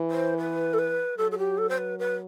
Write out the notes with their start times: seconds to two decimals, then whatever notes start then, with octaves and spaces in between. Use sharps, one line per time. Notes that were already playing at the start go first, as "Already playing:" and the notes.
Already playing: E3
0.11 C5
0.38 B4
0.73 A4
0.79 B4
1.18 F#3 A4
1.31 A4
1.38 G4
1.58 A4
1.69 C5
1.78 B4
1.99 B4